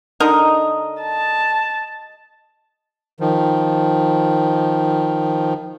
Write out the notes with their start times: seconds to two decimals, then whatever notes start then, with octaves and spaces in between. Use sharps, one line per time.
0.20 D3 D#4 A#4 D#5
1.02 A5
3.20 D#3 F3